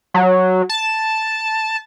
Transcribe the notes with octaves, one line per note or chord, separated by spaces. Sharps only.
F#3
A5